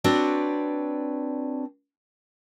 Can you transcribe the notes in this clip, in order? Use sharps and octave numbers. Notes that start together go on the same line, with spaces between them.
C4 D4 F#4 B4 C#5 D5